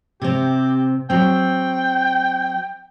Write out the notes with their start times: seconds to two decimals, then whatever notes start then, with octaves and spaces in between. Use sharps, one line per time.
0.22 C3 C4 G4
1.10 F#3 C4 G5